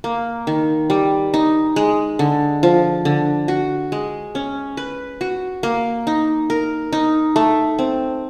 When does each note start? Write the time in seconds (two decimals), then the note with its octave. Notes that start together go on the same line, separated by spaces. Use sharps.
0.04 A#3
0.47 D#3
0.90 G3
1.34 D#4
1.76 G#3
2.19 D3
2.63 F3
3.05 D3
3.48 F#4
3.92 G#3
4.35 C#4
4.77 B4
5.21 F#4
5.63 A#3
6.07 D#4
6.50 A#4
6.93 D#4
7.36 A3
7.79 C4